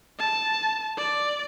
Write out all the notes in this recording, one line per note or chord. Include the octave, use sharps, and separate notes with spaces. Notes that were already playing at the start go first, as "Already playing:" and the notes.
A5
D5